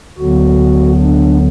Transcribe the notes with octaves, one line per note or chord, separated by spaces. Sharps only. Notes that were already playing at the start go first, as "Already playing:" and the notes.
D2 D3 F#3 B3 F#4
D4